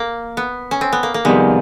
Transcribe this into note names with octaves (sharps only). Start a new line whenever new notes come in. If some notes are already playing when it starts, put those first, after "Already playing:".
Already playing: A#3
B3
C#4
C4
B3
A#3
A#3
F2 C3 D#3 G3 G#3 B3